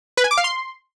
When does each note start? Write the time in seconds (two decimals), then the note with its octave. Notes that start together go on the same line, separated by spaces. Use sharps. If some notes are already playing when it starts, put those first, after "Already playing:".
0.17 B4
0.24 G#5
0.31 D6
0.38 F5
0.44 C6